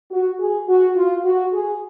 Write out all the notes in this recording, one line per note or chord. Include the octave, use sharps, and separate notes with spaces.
F#4
G#4
F#4
F4
F#4
G#4